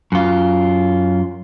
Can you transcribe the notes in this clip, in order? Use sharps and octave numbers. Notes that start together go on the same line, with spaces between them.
F#2 F4